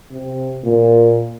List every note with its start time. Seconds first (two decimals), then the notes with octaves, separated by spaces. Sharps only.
0.11 C3
0.65 A#2